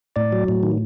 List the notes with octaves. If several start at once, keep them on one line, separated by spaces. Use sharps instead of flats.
A2 D5
F#3
A2
D#3